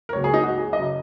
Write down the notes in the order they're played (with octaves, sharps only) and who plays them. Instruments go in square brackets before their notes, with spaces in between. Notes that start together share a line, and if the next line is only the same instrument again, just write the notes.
[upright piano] A#4
C#2 C#3 F#3 A#3 C#5
G#4
D#4
F#4
G#4
F#1 F#2 C#3 D#5